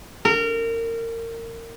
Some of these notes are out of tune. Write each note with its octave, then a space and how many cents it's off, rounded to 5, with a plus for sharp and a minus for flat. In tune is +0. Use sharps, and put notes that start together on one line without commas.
A#4 -25